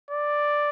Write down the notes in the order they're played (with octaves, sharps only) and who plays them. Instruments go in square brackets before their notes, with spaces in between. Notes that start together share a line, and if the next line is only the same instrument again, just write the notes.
[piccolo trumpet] D5